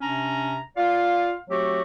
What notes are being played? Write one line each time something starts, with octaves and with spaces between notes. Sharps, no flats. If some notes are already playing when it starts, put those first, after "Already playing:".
C3 C#4 D4 A#5
F4 D5 F5
F#3 A3 C4 F#4 G4